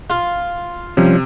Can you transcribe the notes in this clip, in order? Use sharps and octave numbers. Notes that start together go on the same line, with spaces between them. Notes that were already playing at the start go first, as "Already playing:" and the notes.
F4
C3 F3 G3 C#4